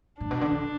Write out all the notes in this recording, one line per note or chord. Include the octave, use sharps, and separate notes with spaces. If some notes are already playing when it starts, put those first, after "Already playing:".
A2 D4
B2
D3
D3